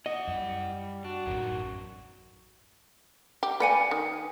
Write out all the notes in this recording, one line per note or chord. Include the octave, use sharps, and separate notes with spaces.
E4 D#5 F#5
F#2 G3
D4 F#4
A1 F#2 C#4 D#4 A#4
G4
B4 D5 F#5 G#5
D#3